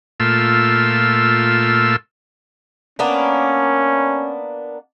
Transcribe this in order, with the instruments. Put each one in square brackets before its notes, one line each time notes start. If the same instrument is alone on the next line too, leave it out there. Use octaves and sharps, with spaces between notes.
[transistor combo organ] A#2 A3 F4 E6
[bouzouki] A#3 B3 D4 [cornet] C#4